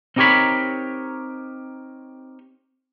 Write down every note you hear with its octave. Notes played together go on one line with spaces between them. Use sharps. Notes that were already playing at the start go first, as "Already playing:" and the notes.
C4 D#4 G4 A#4 C#5 B5